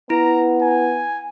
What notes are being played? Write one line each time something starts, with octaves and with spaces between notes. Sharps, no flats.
B3 E4 A#5
G#5